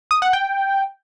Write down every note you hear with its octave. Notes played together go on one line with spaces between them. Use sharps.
D#6
F#5
G5